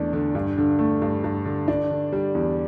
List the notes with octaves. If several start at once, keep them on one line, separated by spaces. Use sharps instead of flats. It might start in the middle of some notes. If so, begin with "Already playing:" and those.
Already playing: E2 D3 A3 D4
D3
G2
D3
A3
G2
G2
D3
D4
D3
G3
E2